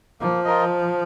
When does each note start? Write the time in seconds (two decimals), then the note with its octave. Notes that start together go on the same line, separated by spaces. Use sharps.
0.21 F3 A#3
0.45 F4 A#4 D#5